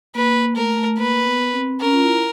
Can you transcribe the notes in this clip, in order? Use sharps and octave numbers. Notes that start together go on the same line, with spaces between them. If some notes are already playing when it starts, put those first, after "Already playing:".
A#3 B4
A#3
A3 A#4
A3
A#3 B4
B3
C4
C#4 A#4
F4
E4